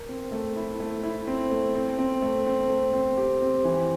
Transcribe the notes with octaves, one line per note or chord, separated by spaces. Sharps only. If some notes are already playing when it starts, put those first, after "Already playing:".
Already playing: A#4
C4
A3
E4
A3
E4
C4
A3
C4
C4
A3
C4
A3
C4
G4
C4
E3